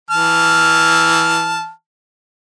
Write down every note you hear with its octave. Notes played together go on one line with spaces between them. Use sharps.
E3 A5 F6